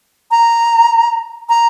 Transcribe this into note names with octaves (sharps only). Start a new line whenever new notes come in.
A#5
A#5